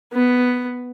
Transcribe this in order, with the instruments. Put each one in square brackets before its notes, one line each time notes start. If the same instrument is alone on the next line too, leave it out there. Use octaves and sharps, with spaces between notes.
[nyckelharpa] B3